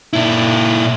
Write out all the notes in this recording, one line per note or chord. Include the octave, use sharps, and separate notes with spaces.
A#2 E4